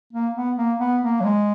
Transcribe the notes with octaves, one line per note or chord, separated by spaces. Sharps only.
A#3
B3
A#3
B3
A#3
F#3
G#3